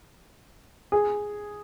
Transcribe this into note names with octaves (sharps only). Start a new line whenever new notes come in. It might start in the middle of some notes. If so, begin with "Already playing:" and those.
G#4